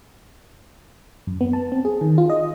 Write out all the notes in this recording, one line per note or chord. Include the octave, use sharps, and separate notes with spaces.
F#2
B3
A5
C4
G#4
D#3
F4
D#5